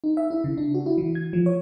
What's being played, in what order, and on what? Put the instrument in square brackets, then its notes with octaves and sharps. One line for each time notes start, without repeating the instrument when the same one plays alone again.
[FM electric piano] D#4
E5
E4
C#3
D4
F#4
E4
E3
G#6
F3
C#5